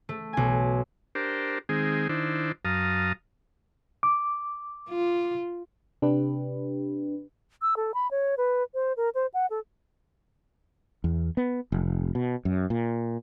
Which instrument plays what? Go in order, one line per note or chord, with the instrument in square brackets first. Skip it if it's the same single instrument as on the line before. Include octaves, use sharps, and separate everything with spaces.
[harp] A3
B1 G#5
[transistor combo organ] D4 G4 A#4 C5
D#3 G#3 C4 G#4
D#3 D4 E4 C5
F#2 F5 A5 A#5 D#6
[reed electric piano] D6
[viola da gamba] F4
[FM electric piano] C3 D4 G4 B4
[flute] E6
A4
B5
C#5
B4
C5
A#4
C5
F#5
A4
[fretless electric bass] E2
B3
F1
B2
F#2
A#2